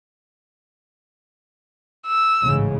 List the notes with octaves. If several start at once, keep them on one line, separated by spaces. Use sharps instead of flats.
E6
A1 G#2 C#3